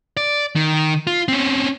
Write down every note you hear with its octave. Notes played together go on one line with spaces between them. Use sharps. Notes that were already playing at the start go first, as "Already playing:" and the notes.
D5
D#3
F4
C4 C#4